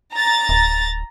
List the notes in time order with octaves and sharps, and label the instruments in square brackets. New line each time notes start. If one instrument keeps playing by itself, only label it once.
[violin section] A#5 A6
[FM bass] D1